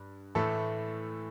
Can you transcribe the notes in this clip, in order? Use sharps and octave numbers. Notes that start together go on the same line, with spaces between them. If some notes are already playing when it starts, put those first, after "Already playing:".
Already playing: G2
A2 E3 A3 E4 A4